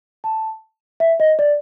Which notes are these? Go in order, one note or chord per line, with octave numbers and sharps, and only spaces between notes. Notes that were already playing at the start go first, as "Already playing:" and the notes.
A5
E5
D#5
D5